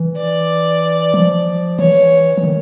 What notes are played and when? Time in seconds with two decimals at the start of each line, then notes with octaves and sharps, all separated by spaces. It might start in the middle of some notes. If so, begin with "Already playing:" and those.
Already playing: E3
0.17 D5
1.14 F3
1.79 E3 C#5
2.38 E3
2.44 D#3